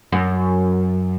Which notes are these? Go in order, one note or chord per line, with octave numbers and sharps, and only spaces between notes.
F#2